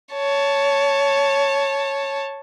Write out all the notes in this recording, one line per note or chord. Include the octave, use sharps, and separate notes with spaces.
C#5 A5